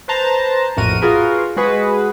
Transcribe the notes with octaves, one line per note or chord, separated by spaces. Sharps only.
B4 C5 A5 A#5
A#1 F2 A2 F#4 A#4 D#7
F4 F#4 G#4 A#4 B4
G#3 F#4 G#4 B4